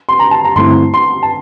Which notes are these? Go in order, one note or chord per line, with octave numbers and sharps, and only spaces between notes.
C6
A#5
A5
A#5
G2 D3 A3 C4 E4 C6
C6
A5